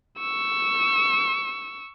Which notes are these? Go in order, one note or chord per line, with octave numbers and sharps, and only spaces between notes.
C#6 E6